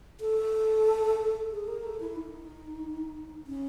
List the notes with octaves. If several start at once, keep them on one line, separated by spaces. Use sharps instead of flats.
A4
G#4
A#4
A4
E4
D#4
C#4